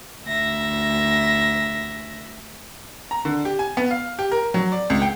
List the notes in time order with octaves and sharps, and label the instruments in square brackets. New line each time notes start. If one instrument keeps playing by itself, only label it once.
[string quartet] D2 E5 A#6
[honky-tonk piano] A#5
D3
G4
G#5
B3
F5
G4
A#4
F#3
D5
C#2
G5